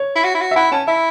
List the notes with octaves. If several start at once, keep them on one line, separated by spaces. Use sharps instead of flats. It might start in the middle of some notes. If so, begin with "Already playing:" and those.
Already playing: C#5
E4
F#4
E4
F#4
E5
E4 F#5
C#4 A5
E4 E5